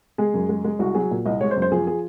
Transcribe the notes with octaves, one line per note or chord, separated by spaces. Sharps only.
G#3 G#4
F#2
G#3
G#3
C2 F#4
F#3 G#4
A#2
C2 D#5
G#3 C#5
C5
F#2
C5
F3 G#4
G#4